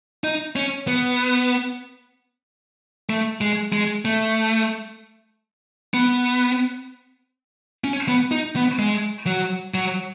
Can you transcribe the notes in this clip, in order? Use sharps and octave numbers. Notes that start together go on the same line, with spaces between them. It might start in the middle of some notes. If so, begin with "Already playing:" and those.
D#4
C#4
B3
A3
G#3
G#3
A3
B3
C#4
B3
D#4
B3
G#3
F#3
F#3